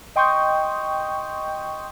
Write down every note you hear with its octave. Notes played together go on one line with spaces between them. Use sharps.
D#5 G5 C6 C#6 D#6 G6